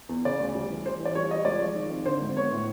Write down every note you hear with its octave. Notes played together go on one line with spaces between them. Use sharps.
E2
C#3 D5
D2
G3
E3
E3 C5
E3
D5
G3 C#5
G3 D#5
C#2 D5
F3
D#3
C4
D3 C5
G#1
B3 C#5
A2